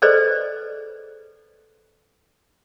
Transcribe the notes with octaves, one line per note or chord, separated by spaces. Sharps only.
G#4 A4 B4 C5 D5 D#5